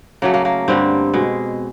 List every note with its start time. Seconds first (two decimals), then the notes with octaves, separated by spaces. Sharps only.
0.22 C#3 F#3 A3 A#3
0.34 A#3
0.45 A#3
0.68 G2 D3 G3 C4
1.14 B2 G#3